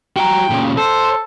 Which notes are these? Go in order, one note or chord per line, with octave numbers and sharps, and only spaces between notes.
F#4 G5 A#5
A#2 C#3
A4 C5